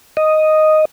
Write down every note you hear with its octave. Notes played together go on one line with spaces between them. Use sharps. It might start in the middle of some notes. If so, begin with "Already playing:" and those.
D#5